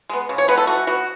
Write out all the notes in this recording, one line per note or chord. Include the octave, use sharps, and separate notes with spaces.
G#3 B3
C#3
C#5
G#3 B3 B4
A4
E3 F#4
B3 F#4